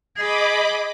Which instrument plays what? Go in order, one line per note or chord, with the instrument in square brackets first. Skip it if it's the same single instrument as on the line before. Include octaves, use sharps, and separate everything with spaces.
[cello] G#4 [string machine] D#5 B5 D6